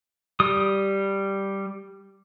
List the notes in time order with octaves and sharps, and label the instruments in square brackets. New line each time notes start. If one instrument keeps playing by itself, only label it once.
[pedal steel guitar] G3 D#6